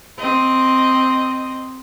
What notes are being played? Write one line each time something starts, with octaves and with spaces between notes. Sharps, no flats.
C4 D#5